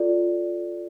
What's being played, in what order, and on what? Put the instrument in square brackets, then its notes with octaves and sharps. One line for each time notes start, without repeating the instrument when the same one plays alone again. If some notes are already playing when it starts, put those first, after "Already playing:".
Already playing: [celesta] F4 A4 D5